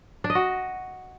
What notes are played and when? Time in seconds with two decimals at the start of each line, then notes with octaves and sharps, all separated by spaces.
0.24 D4
0.30 D#5
0.35 F#4